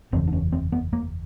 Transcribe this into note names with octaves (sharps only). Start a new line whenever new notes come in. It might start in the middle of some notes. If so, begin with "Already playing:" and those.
F#1 E2 C#3 C4
D4
C#4
C4
B3
A#3